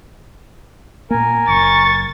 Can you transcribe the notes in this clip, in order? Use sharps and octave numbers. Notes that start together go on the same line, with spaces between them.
A#2 A#3 A#4 G#5
F#1 C#6 A6